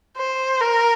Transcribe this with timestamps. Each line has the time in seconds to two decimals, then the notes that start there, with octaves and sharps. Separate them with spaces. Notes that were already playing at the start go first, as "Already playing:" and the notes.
0.18 C5
0.61 A#4